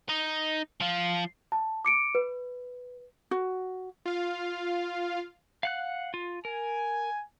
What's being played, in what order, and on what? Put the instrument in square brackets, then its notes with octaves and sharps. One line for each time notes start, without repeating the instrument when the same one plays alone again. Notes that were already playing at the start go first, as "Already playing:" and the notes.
[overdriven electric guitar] D#4
F3 F4
[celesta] A5
D6 C#7 D7
B4
[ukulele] F#4
[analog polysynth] F4 F5
[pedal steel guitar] F5 F#5 F#6
F4
[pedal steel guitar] A#4 [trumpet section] G#5